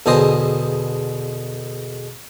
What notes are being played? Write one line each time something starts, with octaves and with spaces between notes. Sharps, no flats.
E2 B2 D3 G#4 C5 D#5